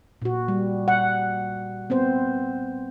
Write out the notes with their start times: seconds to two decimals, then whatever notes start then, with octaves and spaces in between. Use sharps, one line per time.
0.22 A#2 F#4
0.48 G3
0.88 F#5
1.90 B3 C4 C5